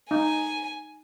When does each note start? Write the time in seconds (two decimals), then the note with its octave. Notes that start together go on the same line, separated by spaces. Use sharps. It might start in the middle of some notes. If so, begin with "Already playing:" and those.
0.11 D#4 G#5